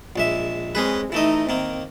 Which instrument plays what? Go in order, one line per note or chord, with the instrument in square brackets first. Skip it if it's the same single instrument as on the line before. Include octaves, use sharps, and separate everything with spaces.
[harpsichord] A#1 G#3 E5
[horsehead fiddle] G#3 C4 [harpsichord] C#4 G#4 B4
[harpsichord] E3 A3 D#5 [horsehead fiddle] D#4 E5
[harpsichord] D#3 A#3 [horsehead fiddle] C4